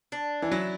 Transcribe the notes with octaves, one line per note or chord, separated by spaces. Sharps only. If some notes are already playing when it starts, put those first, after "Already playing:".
D4
E3
F#3 E4